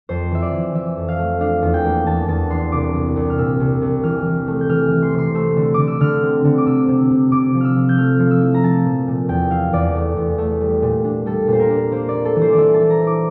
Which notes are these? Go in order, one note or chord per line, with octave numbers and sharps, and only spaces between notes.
F2 C5
E3 E5
D5
E3
E3 E5
F2
F5
A3
D4 F5
E2
G5
A#3
E2 A5
E2 A5
D4 C6
C2 D6
C2
C2
F6
A#2 E6
C2
C2
E3 F6
E3
A3
G6
E3 F6
E3
C6
C3 C6
A3 E6
D3
D3 D6
E6
D3 F6
C4
D3
D6
C3 E6
C3
C3
C3 D6
F3
E6 F6
F3
G6
A3 F6
F3
E6
E4
A#5
F3 A5
A#2
A#2
E2 G5
E4 F5
E2 D5
A3
E2
A3
G3
A#2
D4
G3 A4
A#2
C5
A#4
D4
A#3 C5
D5
A#3
A4
E3
C5
D5
E3 E5
A5
E4
A#5
E4
D6